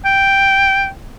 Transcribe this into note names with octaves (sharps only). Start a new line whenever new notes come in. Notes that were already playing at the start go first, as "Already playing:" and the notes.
G5